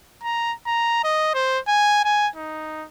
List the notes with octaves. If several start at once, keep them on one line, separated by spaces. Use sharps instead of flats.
A#5
A#5
D#5
C5
G#5
G#5
D#4